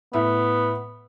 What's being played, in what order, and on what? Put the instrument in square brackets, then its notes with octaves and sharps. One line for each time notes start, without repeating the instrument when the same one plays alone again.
[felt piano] A2 E5 [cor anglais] B3